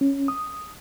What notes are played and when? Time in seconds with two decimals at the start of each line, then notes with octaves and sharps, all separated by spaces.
0.01 C#4
0.28 D#6